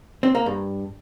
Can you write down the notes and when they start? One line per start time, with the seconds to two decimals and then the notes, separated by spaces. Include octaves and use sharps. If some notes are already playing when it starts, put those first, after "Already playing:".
0.23 C4
0.35 A#3
0.46 G2